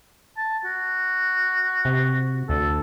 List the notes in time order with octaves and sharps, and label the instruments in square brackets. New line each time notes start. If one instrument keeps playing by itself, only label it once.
[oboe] A5
F#4
[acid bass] C3
[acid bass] D2 [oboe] A4